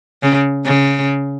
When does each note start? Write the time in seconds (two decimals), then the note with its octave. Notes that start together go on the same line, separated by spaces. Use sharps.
0.23 C#3
0.65 C#3